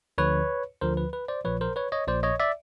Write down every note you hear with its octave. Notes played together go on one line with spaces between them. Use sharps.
D2 D3 F3 B4 C#5
D2 D3 F3 A#4 C5
B4
B4
C5 D5
A#1 A#2 F3 B4 C#5
A#4 C5
B4 C#5
C#5 D#5
A#1 A#2 F3 C5 D5
C#5 D#5
D5 E5